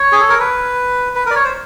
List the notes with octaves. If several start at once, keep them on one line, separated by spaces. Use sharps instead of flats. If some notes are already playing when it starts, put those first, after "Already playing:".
Already playing: C#5
G#4
A4
A#4
B4
B4
A#4
D5
C#5
C5